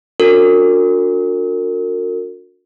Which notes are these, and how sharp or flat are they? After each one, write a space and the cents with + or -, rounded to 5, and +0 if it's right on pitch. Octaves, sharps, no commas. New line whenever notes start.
D4 -20 F#4 -30 A#4 -40